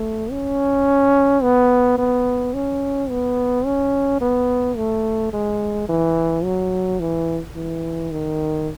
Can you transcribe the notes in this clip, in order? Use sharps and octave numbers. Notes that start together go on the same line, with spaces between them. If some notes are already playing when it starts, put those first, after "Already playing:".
Already playing: A3
C#4
B3
B3
C#4
B3
C#4
B3
A3
G#3
E3
F#3
E3
E3
D#3